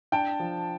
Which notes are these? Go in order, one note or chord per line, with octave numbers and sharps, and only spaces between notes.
D4 G5 A5
F3